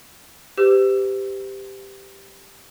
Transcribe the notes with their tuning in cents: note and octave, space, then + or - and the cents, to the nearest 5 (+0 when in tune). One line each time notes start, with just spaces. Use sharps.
G4 +0 C5 -45 E6 +20